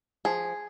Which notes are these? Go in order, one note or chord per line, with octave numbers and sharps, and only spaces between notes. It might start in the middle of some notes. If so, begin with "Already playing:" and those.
F3 G#4